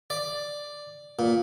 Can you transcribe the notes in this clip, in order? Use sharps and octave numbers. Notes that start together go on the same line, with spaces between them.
D5
A#2